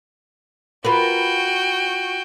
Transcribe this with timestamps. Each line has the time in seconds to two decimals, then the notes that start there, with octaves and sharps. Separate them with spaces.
0.85 F4 F#4 A#4 B4 G5